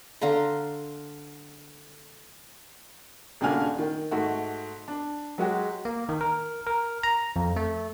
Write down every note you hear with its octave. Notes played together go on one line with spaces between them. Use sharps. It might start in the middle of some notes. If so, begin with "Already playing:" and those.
D3 F5 A#5 C6
D#1 C#3 D4 F#4 G#5 F6
D#3 G5
G#2 A3 F#4
D4
F#3 G#3 F#4 G4
A#3
D#3
A#4
A#4
A#5
F2
A3